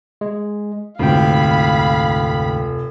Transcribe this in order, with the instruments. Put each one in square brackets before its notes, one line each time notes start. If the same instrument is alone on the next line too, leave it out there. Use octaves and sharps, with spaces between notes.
[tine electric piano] G#3
[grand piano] F1 [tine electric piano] D2 G#2 G5 [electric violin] F5 B5